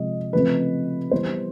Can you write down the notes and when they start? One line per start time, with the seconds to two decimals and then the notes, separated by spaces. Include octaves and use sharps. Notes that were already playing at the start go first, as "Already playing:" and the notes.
Already playing: C3 F3 G#3 D#5
0.33 C#3 F3 A3 C4 B4
1.11 E3 G3 B3 C5